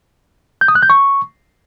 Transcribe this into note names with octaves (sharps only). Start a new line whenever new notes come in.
G6
D#6
F#6
G6
C#6